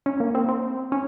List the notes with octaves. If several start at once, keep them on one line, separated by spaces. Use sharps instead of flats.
C#4
A#3
C4
C4
C#4